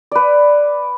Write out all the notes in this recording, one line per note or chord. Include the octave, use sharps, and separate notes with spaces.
B4 D5